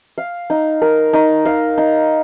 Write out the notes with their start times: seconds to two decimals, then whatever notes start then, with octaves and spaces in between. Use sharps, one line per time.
0.18 F5
0.50 D#4
0.82 A#4
1.13 D#4
1.45 F5
1.78 D#4